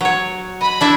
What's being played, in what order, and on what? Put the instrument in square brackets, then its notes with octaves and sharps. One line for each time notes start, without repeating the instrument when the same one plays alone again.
[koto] F#3 C#5
[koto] D#5 [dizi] B5
[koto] D4 E4 E5